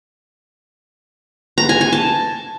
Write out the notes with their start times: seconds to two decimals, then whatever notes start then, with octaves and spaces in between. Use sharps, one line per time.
1.58 A#5
1.69 G#5
1.81 G#5
1.93 A5